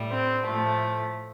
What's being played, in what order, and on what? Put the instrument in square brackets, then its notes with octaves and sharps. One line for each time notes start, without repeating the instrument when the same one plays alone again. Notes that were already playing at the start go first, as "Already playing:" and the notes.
Already playing: [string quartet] A2 G3
C4
A2 F3 A3